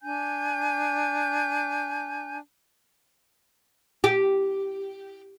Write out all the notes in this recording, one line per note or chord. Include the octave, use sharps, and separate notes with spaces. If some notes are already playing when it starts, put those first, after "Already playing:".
D4 G#5 G6
G4